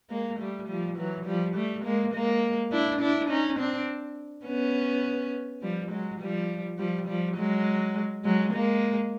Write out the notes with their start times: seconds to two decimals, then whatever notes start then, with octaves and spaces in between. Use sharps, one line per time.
0.10 G#3 A#3
0.39 G3 A3
0.68 F3 G3
0.98 E3 F#3
1.26 F3 G3
1.55 G3 A3
1.84 G#3 A#3
2.14 G#3 A#3
2.72 D4 E4
3.01 D4 E4
3.30 C#4 D#4
3.59 C4 D4
4.46 B3 C#4
5.62 F3 G3
5.91 F#3 G#3
6.20 F3 G3
6.79 F3 G3
7.08 F3 G3
7.37 F#3 G#3
8.24 F#3 G#3
8.53 G#3 A#3